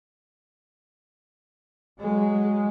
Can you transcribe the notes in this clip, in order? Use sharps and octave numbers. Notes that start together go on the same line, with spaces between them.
F#3 G#3